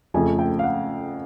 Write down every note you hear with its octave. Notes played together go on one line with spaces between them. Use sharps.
F2 C#3 F3 A3 G#5
G5
F5
F#5